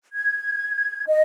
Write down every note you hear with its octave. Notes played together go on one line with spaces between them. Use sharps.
G#6
D#5